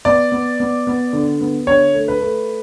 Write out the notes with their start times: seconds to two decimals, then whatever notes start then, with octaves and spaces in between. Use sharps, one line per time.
0.05 B3 D5
0.32 B3
0.60 B3
0.87 B3
1.13 D3
1.41 B3
1.67 D3 C#5
1.94 A3
2.08 B4
2.21 A3